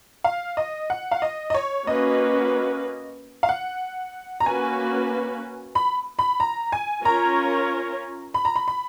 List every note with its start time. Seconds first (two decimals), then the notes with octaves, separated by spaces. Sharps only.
0.24 F5
0.57 D#5
0.90 F#5
1.11 F5
1.22 D#5
1.50 D#5
1.54 C#5
1.87 A#3 C#4 F#4 B4 D#5
3.43 F5
3.49 F#5
4.40 A#5
4.46 A#3 C#4 F#4 B4 G#5
5.75 B5
6.19 B5
6.40 A#5
6.72 G#5
7.05 C#4 F4 A#4 C#5 A#5
8.34 B5
8.45 A#5
8.56 B5
8.68 B5